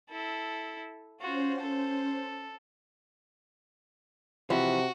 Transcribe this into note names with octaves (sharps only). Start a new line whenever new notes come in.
E4 A4
C#4 F4 F#4 C5
A4
C3 E3 F3 F#4